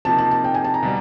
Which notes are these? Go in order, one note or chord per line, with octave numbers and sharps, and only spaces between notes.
C3 F3 A#3 D#4 A5
A5
A5
G5
G#5
A5
A#5
B2 G3